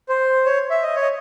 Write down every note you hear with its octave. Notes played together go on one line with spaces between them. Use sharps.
C5
C#5
E5
D#5
C#5
D#5